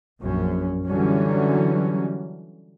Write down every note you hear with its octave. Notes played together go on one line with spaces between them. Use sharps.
A#1 F#2 C#4
D3 E3 F#3 G3 C#4